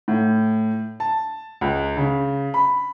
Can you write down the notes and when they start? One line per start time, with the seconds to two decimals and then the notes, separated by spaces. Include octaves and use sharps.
0.08 A2
1.00 A5
1.61 C#2
1.97 C#3
2.54 B5